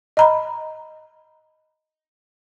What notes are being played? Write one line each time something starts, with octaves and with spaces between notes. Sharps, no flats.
D#5 A#5 B5